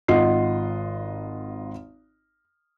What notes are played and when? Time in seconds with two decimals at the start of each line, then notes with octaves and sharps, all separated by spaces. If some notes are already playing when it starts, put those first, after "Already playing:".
0.08 G#1 F4 D#5 F#5 C7